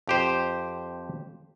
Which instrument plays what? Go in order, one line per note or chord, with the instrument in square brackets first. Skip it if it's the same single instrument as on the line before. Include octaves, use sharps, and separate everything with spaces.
[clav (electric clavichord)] F2 G4 C5